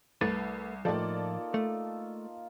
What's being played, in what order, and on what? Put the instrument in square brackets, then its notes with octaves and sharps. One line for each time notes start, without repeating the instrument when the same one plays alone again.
[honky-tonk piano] C2 [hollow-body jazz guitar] A3 A4 B4
[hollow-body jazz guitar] A2 F3 [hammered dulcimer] A#3 D#4 F4 [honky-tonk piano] A4 D5
[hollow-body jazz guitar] A3